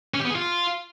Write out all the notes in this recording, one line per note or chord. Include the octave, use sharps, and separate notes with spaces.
C#4
G4
B3
G#4
F4